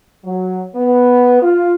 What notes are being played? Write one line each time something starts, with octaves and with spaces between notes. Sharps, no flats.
F#3
B3
F4